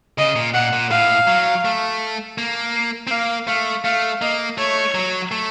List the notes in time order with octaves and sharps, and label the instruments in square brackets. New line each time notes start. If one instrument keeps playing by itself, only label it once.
[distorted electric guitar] C#3 [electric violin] D#5
[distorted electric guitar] A#2
[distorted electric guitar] A#2 [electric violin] F#5
[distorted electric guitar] A#2
[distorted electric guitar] A2 [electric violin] F5
[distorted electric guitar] F#3
A3
A#3
C4
[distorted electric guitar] A#3 [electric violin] F5
[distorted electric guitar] A3 [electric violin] F5
[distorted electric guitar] A3 [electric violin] F5
[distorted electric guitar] A#3 [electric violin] D#5
[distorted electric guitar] A3 [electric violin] C#5
[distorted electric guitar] F#3
A3